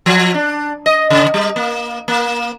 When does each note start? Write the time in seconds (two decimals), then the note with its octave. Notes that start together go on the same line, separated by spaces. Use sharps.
0.06 F3
0.34 D4
0.86 D#5
1.10 C#3
1.34 G3
1.56 A#3
2.08 A#3